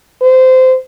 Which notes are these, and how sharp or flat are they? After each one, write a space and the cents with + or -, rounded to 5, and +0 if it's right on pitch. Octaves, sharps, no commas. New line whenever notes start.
C5 -20